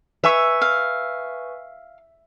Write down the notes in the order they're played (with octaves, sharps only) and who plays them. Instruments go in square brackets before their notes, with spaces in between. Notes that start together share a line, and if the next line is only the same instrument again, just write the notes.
[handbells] B4 G#5 C#6 [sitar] E5
[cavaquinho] F5